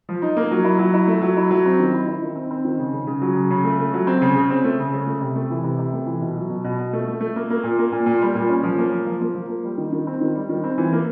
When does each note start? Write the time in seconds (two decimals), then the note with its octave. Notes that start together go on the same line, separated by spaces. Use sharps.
0.09 F3
0.22 D#4
0.37 A#3
0.51 F#3
0.64 E4
0.79 F#3
0.94 E4
1.08 A3
1.22 F#3
1.37 E4
1.51 F#3
1.65 C4
1.80 D#3
1.93 E4
2.07 E4
2.22 D#3
2.36 C4
2.51 C4
2.65 D#3
2.79 C#3
2.94 C#3
3.07 C#3
3.22 F#3
3.36 C#3
3.50 C#3
3.64 A3
3.79 A3
3.94 F#3
4.07 C4
4.22 C#3
4.36 C#3
4.50 C4
4.64 A3
4.79 C#3
4.94 C#3
5.07 A3
5.21 C3
5.36 A3
5.50 E3
5.64 C3
5.79 C3
5.93 A3
6.06 E3
6.21 B2
6.36 F#3
6.50 B2
6.64 B2
6.79 B2
6.93 A3
7.07 A3
7.21 A3
7.36 A#3
7.50 A#3
7.64 A#2
7.79 A#3
7.92 A#2
8.06 A#2
8.22 G3
8.35 A#2
8.49 C#4
8.63 F3
8.78 A#3
8.92 F3
9.06 F3
9.21 A#3
9.35 F3
9.49 A#3
9.64 G3
9.78 D#3
9.92 D#3
10.07 C4
10.21 D#3
10.35 G3
10.49 D#3
10.64 C4
10.78 E3
10.93 A#3